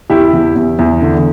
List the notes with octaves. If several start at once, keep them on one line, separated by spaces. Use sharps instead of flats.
E2 E4 G4
E2
E2
E2
D3